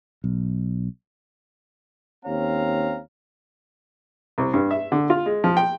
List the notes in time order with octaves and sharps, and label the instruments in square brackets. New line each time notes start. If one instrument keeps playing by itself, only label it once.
[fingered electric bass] B1
[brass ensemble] D#2 C4 C#4 C#5 F5 A#5
[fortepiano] C2
G2
E5
D3
F4
G#3
F3
G5